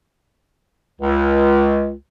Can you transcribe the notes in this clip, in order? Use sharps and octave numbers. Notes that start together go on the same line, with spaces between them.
C#2